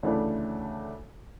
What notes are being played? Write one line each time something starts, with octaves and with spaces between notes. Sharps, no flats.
D2 C#3 E3 A3 D4